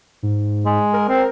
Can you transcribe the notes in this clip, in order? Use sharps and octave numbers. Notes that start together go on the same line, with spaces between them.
G#2
G#3
A#4
C4